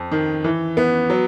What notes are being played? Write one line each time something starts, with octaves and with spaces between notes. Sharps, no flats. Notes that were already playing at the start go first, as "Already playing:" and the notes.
Already playing: F2
D#3
E3
B3
F#3